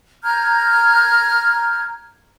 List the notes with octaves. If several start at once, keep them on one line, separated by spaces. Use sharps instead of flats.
A#5 F6 G6 G#6